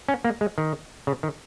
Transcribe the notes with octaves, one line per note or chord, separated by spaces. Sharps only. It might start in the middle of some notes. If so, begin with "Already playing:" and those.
C#4
A#3
G#3
D#3
C#3
D#3